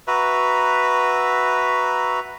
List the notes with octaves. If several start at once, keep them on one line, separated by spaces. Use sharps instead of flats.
F#4 B4 E5 A#5